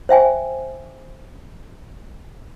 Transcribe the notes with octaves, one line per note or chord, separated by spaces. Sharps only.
C5 E5 G5 G#5